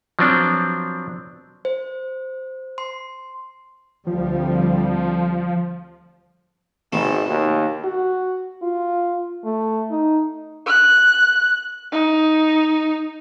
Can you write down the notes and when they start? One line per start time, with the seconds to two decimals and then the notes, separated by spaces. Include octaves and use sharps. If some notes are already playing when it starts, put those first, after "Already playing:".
0.19 F3 F#3 B3 C4 D4
1.65 C5
2.78 C6
4.07 D2 F3 G3 C4
6.93 G#1 B2 A3
7.29 D#2
7.84 F#4
8.62 F4
9.44 A3
9.91 D#4
10.66 F#6
11.92 D#4